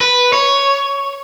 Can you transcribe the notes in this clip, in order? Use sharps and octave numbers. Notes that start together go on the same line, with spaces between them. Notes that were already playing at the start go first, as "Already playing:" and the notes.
B4
C#5